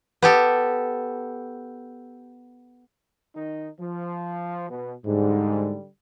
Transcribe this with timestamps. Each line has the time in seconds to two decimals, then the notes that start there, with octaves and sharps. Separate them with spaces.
0.22 B3 G4 A4
3.35 D#3 D#4
3.80 F3
4.70 B2
5.06 G#2 D3 G3